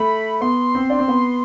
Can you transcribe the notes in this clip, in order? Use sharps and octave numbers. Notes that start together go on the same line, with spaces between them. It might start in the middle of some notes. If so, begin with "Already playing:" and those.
Already playing: A3 B5
B3 C6
C4
D4
C4
B3